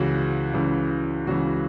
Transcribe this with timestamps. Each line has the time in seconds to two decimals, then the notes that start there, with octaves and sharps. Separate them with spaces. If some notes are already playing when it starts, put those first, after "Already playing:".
Already playing: C#2 C#3 E3 F#4
0.54 C#2 C#3 E3
1.27 C#2 C#3 E3 F#4